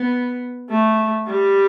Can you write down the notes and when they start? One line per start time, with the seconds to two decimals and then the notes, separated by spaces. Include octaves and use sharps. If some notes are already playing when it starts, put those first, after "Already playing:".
Already playing: B3
0.70 A3
1.26 G3